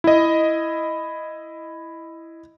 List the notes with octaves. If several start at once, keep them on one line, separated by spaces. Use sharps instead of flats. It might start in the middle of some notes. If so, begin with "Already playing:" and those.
E4 D#5